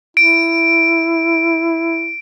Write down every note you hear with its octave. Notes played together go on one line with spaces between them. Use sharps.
E4 D7